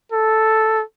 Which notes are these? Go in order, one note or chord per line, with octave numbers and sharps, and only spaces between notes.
A4